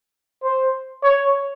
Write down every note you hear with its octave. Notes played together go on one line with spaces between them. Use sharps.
C5
C#5